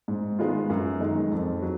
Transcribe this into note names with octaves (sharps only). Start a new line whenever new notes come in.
G#2
D#3 G#3 B3 F4
F#2
D#3 G#3 D#4
F2
F#3